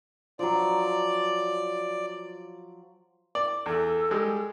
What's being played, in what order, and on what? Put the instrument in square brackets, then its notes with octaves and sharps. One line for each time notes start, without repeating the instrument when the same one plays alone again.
[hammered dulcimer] F3 F#3 [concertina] D5
[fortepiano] D5
[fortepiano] E2 [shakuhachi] A4
[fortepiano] G3 G#3